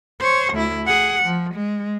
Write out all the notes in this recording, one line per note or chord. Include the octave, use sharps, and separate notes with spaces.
C5 C#5
D2 E4
G#4 F#5
F3
G#3